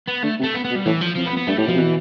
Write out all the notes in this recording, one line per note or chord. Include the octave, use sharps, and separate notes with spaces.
B3
D3 A3
C3
A3
B3
B3
B2
G3
A2 E3
F3
F2 F3
B3
F2
B3
G2 A3
A2 G3
B2 F3
C3
B2 E3